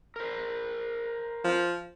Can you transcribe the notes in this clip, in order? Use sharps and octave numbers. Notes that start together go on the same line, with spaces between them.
A#4 C5
F3